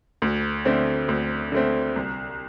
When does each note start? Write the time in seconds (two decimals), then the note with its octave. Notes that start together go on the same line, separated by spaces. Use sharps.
0.22 D2
0.65 D3 A3 C4
1.09 D2
1.52 D3 A3 C4
1.96 C2